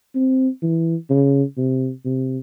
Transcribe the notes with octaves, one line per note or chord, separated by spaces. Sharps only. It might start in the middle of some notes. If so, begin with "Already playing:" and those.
C4
E3
C#3
C3
C3